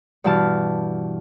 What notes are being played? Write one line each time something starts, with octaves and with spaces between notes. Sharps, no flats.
G2 B2 E3 G4 A5 F6